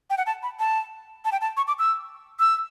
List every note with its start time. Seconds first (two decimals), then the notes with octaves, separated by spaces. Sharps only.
0.10 G5
0.18 F#5
0.26 A5
0.43 B5
0.59 A5
1.25 A5
1.32 G5
1.41 A5
1.57 C#6
1.68 D6
1.79 E6
2.40 E6